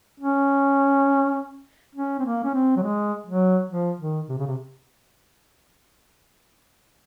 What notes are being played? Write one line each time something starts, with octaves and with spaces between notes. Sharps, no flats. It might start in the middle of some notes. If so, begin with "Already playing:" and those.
C#4
C#4
C4
A#3
C#4
C4
F#3
G#3
F#3
F3
D#3
C3
C#3
C3